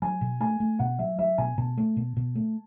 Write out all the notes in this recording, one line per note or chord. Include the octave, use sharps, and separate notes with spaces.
F#3 G#5
B2
A3 G#5
A3
B2 F#5
F#3 E5
F#3 E5
B2 G#5
B2 A5
A3
B2
B2
A3